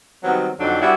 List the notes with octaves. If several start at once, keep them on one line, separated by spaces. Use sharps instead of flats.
D#3 F#3 G3 B3 C4
F2 D3 F#3 D4 D#4
G3 B3 D4 E4 F#4